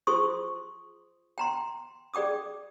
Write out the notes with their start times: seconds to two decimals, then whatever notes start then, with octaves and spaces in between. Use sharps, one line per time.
0.07 F4 G#4 C5 C6 C#6 D#6
1.38 G5 A#5 C6
2.14 G#4 D5 G5 D6 D#6